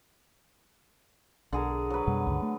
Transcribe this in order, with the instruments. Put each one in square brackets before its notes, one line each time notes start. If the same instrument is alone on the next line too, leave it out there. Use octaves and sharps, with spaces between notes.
[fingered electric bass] B1 [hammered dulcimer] D3 G#4 A#4
[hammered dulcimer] F#3 B4
[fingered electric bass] F2 B2 G3
C#2 G2 D3
A3